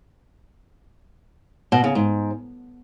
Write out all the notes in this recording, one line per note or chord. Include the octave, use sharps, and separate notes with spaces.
B2
C#3
G#2